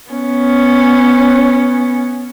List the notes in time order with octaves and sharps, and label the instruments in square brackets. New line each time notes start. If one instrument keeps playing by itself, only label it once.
[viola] B3 C#4